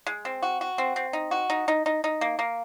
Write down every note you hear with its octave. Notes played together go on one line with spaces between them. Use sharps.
G#3
C4
F#4
F#4
C4
C4
D#4
F#4
D#4
D#4
D#4
D#4
A#3
A#3